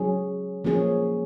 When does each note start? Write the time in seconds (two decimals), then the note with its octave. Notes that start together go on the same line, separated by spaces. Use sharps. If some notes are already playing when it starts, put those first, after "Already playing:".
Already playing: F#3 C#4 G#4
0.64 F3 A#3 C#4 G#4